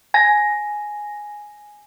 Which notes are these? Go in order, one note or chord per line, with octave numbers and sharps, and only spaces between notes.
G#5 A#6